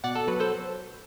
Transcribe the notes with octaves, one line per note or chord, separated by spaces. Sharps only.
B2 D5 F#5
A4
F#3 B4
A4 C5